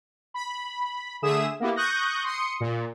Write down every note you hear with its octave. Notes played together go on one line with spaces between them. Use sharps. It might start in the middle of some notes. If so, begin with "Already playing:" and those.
B5
D3 A3 G#4 E5 D#6 E7
A#3 B3 E4 G4
C#6 D#6 F#6 G6 A#6
C6 D#6 C#7
A#2